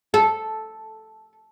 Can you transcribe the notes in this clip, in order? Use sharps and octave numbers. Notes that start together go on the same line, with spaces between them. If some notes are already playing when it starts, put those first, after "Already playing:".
A4